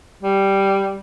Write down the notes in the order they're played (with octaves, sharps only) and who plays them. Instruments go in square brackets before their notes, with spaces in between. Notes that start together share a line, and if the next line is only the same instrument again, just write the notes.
[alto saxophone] G3